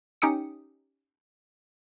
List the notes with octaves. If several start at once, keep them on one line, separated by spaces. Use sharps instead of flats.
C#4 D#4 G4 G5 D#6 C#7